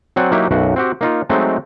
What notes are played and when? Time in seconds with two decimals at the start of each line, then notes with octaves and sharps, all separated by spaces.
0.16 F#3 C4 D5 F#5 G#5
0.31 F#3 A#3 D#4 E4 G4
0.51 B1 F#2 F#4
0.76 C4 F#4 G4
1.01 A#3 D#4 F4
1.30 F#3 G#3 A3 C4 D#4